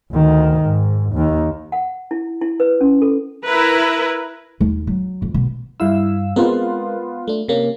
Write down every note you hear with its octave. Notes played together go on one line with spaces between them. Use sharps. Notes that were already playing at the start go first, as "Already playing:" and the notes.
D2 D#3
G#2
D#2 D#3
F#5
E4
E4
B4
C#4
A4
E4 A#4 B4
D#2
F#3
F2
B2
G2 E4 F5 E6
G#3 B3 C4 F4 A#4
A3 D4
C3 A#3 C#4